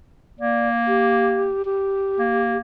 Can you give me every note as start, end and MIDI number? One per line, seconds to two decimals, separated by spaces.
0.40 1.51 58
0.40 0.69 74
0.88 1.65 67
1.65 2.57 67
2.19 2.59 58